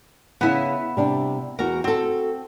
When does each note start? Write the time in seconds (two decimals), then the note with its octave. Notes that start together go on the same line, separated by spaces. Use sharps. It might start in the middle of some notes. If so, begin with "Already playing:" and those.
0.41 C#3 B3 C#4 E4 E5
0.97 C3 G3 D4
1.59 E2 F#4 A#4
1.84 C4 F#4 A4